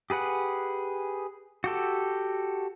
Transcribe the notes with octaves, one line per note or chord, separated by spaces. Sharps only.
G4 G#4 B4 F#5
F#4 G4 A4